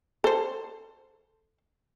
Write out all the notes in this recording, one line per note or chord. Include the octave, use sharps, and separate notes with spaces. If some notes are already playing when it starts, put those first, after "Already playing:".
A4 C5